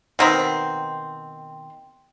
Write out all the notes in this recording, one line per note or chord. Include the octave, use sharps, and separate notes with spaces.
B2 D#3 C4